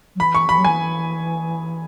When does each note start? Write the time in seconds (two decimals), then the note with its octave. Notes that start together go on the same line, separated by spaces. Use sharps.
0.15 F#3
0.19 E3 B5
0.35 C#6
0.49 E3 B5
0.57 F#3
0.65 E3 G#5